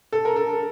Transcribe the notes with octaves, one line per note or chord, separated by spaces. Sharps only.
A4
A#4
A4